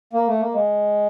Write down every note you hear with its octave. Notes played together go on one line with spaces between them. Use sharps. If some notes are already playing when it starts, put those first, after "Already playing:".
A#3
A3
A#3
G#3